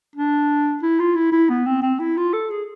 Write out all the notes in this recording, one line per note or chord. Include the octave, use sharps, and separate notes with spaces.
D4
E4
F4
E4
E4
B3
C4
C4
E4
F4
A4
G#4